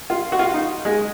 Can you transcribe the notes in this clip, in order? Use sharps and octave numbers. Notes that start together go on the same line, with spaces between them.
F4
F#4
F4
D#4
G#3